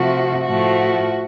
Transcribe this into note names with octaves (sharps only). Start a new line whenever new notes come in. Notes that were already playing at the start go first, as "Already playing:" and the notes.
Already playing: C3 F3 A3 F#4
A2 F3 A3 F#4